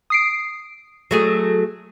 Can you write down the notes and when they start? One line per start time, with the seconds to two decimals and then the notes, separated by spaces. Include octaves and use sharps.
0.10 D#6 C7 D7
1.11 F#3 A3 G#4